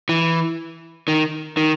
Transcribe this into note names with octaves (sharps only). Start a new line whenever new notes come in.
E3
D#3
D#3